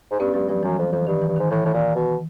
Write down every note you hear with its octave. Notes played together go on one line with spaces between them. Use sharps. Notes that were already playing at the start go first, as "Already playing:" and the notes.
G#2
G2 B3 C#4
G2 F#3 G#3
G2 F3 G3
F#2 E3 F#3
F2
F2 E3
G2 D#3
E3
G2
G#2 D#3
A2 E3
A2 D#3
A#2
B2